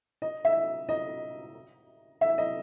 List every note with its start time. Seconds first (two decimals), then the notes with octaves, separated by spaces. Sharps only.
0.22 D#5
0.45 E5
0.89 D#5
2.21 E5
2.38 D#5